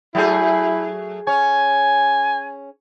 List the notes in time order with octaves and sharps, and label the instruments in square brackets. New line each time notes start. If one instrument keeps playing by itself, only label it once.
[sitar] F#3 A3 G#4 [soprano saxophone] E4
[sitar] C#4 C#5 [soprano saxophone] G#5